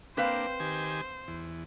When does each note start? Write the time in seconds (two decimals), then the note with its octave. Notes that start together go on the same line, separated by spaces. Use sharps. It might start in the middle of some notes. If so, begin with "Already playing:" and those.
0.17 A#3 C4 D4 B4 C5 F5
0.60 D#3 G4 G#5
1.28 E2